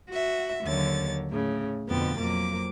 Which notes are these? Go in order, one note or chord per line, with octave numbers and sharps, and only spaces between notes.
F#4 E5
D#2 D3 F#3 C#5 A6
A2 C#3
F2 B2 D3 B3 G5 A6
F2 F#3 A#3 D6